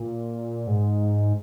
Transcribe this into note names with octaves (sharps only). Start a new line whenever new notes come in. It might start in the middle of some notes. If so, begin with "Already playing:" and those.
Already playing: A#2
G#2